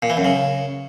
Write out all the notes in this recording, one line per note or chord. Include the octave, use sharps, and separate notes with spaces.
A#2
E3
F#2
C#3